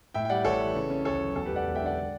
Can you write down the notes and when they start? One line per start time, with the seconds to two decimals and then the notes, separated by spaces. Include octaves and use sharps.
0.14 A2 E5 G5
0.25 G5
0.30 G3 D5 F#5
0.45 A1 A4 C#5
0.60 E3
0.75 C#3
0.90 C#4
1.05 D2 A4 C#5
1.20 F#3
1.35 E2 A4
1.45 E1 G4 B4
1.56 D5 F#5
1.66 E1
1.75 E5 G5
1.81 D3
1.86 D5 F#5